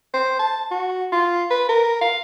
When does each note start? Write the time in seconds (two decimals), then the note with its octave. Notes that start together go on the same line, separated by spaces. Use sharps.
0.14 C5
0.39 A5
0.71 F#4
1.12 F4
1.51 B4
1.69 A#4
2.01 F5